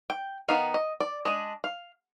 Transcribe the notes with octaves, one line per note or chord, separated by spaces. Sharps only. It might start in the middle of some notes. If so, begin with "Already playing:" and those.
G5
D#3 B3 D#4 F5
D#5
D5
G#3 D4 D#5
F5